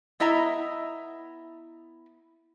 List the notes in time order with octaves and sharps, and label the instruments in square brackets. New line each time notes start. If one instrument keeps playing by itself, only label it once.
[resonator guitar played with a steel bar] B3 E4 D#5 E5 A#5